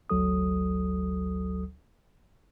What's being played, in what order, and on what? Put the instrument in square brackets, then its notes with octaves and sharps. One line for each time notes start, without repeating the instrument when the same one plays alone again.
[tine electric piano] G#1 D2 F#3 A4 D#6